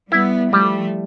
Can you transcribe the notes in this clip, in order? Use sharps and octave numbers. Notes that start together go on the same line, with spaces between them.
G3 B3 E4
F3 G3 A3